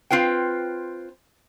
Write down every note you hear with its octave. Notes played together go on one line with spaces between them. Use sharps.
C4 F4 B4 G5